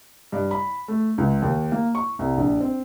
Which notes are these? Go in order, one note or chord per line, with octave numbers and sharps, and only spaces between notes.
G2
B5
A3
C#2
D#2
A#3
C#6
C2
A#1
C4